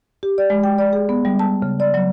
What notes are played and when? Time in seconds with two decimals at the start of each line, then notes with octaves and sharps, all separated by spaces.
0.23 G4
0.38 D5
0.50 G#3
0.63 G5
0.78 D5
0.93 G#4
1.09 B3
1.25 G3
1.39 A5
1.62 C#3
1.80 D5
1.94 F#3